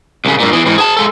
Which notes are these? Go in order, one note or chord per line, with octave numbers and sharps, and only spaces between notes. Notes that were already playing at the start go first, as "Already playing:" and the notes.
C2 C#3
G2 A#2
E3 B3
G#2 E3
G#4 A5
G#3 A4